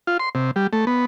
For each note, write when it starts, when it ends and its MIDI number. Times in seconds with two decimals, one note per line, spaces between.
0.07 0.17 65
0.19 0.29 84
0.35 0.51 48
0.56 0.67 55
0.73 0.85 57
0.87 1.05 59